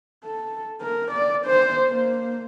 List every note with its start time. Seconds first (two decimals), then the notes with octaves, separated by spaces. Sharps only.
0.25 A4
0.82 A#4
1.12 D5
1.46 C5
1.89 A#3